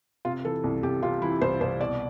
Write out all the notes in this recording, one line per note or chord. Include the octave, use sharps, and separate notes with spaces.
C3 F4
E3 A4
C2
C2 G4
C3 F4
E3 E4
C2 C5
C2 C5
B2 D5